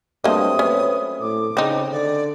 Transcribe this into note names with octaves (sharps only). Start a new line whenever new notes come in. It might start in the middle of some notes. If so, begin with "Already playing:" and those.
G2 F#3 A3 A#3 C4 D#5 D#6
C#4 B4
A2 D6
C#3 C4 D#4
D3 D5